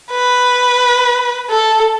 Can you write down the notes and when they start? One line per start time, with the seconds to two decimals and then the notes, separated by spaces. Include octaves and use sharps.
0.12 B4
1.50 A4